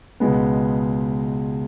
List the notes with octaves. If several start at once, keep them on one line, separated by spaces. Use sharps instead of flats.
C#2 B2 G#3 B3